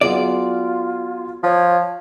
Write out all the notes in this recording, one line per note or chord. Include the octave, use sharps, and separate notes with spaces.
F#3 B3 F4 G#4 D5
F3 C#5